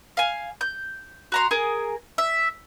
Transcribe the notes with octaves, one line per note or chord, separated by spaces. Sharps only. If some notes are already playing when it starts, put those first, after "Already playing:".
F5 G#5
G6
F#4 A#5 C6
G#4 A#4 G#5
E5